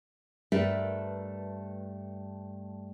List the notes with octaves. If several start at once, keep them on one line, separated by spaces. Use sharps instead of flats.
G2 A3 A#4 B4 E5